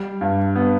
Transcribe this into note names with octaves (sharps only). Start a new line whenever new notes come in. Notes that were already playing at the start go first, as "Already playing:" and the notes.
Already playing: G3
G2
B3